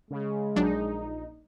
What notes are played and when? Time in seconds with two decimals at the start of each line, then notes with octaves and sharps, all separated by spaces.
0.11 C#3 G#3
0.56 A#1 F#3 D4 D#4